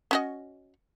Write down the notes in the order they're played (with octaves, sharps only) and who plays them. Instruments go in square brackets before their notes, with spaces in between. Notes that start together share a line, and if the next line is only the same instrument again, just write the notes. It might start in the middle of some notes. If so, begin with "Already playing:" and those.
[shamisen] C#4 F#4 D#5